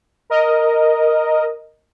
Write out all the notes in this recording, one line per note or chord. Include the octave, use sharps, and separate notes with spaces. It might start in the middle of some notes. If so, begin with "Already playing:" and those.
A#4 D#5